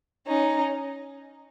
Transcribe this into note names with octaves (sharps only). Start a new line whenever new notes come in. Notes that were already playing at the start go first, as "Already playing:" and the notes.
C#4 D#4